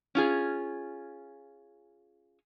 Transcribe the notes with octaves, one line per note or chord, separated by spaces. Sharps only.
C#4 F4 G#4